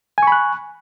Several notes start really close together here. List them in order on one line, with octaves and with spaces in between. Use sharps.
G#5 C#6 B5 F#6